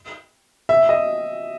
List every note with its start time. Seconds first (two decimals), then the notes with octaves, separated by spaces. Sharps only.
0.69 E5
0.89 D#5